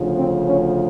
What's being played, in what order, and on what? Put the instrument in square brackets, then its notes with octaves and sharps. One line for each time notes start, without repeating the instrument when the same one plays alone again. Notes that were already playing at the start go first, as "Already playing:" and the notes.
Already playing: [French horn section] D2 C#3 F3
C4
C#4